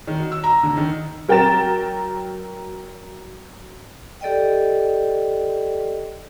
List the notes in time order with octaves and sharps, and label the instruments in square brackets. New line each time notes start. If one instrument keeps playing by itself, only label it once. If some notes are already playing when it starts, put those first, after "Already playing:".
[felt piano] D#3
F#4
E6
A#5
D3
D#3
[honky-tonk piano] F#3 A#4 G5 A#5 A6 E7
[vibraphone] G4 A4 D5 D#5 G5